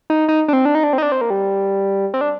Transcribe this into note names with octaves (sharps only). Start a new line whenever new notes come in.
D#4
D#4
D4
C4
D4
D#4
D4
C4
D#4
D4
C4
A#3
G3
C4
D4